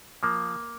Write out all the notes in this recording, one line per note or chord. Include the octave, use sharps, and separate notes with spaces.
F3 A#3